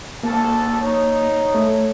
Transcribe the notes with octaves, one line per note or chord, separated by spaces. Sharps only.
G#1 D2 A#3 A4 A5
D#4 C#5
A3